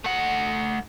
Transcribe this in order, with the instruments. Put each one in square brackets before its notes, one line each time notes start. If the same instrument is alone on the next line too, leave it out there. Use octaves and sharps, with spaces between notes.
[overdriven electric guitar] A3 F#5